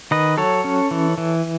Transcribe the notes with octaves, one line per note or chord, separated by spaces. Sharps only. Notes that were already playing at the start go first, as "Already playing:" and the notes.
D#3 B4 D#5
F#3 A4 C#5
C#4
E3
E3